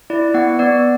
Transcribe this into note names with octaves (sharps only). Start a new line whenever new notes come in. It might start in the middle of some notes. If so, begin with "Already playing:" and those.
E4 D5
B3 F#5
B3 D5